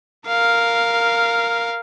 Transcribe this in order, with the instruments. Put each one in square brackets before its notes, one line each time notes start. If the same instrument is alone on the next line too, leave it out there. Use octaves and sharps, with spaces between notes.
[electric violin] A#4 F5